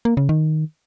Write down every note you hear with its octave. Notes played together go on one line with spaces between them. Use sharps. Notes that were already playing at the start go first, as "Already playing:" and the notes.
A#3
C#3
D#3